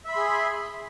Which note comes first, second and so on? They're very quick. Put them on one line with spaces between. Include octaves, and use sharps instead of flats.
E5 B5 C6 G#4